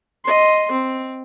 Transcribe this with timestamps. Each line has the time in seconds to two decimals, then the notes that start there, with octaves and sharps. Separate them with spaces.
0.24 D#5 C6
0.72 C4